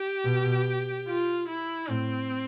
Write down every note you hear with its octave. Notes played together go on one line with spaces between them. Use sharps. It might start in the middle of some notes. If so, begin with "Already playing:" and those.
Already playing: G4
B2
F4
E4
A2 C4